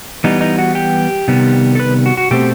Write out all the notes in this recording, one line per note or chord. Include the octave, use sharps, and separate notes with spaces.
E3 G3 B3 D#4
D#4
F#4
G4
C3 D#3 G3 B3
A4
B4
F#4
F#4
B2 A3 C4 G4